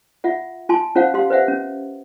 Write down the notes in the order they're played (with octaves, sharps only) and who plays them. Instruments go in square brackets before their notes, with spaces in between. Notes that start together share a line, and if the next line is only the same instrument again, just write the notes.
[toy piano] F4 E5 F#5
F4 G#5 A5 C6
C#4 F4 C5 F5 F#5
G4 F5 C6
B4 C5 E5 F#5
C#4